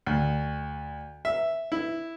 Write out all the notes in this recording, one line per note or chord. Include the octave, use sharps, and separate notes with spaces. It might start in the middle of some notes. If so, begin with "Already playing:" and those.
D2
E5
E4